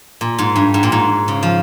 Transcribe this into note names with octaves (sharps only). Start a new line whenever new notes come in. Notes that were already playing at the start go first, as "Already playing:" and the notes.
A#2
G#2
G2
G#2
A#2
G#2
C#3
F3